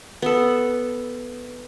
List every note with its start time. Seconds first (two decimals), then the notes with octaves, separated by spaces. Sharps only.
0.22 B3 A4